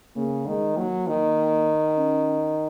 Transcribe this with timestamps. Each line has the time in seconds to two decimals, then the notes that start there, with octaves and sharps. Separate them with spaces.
0.16 C#3 A#3
0.46 D#3 G#3
0.76 F#3 A#3
1.07 D#3
1.97 C#4